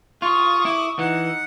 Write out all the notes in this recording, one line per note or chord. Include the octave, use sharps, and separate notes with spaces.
F4 C#6 D#6
E4 D6
E3 D#4 F#5